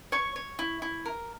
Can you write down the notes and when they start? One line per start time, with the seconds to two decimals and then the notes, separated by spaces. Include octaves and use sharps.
0.12 C#5 C#6
0.36 C#5
0.59 E4
0.82 E4
1.05 A#4